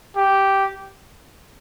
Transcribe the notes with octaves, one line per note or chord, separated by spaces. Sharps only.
G4